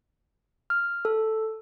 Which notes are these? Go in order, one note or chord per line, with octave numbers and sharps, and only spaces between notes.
F6
A4